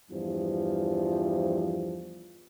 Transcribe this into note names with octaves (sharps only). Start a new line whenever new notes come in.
E2 G2 F3